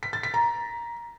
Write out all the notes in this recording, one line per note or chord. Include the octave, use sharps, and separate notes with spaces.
B6
A6
B6
A#5